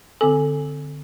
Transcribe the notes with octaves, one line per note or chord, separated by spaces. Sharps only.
D3 C4 A4 G#5